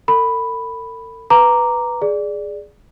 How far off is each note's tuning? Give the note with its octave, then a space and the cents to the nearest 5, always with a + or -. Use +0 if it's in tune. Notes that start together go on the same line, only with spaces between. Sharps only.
A4 +45 B5 +0
B4 +0 A#5 +0 D6 +0
G#4 +0 D5 +0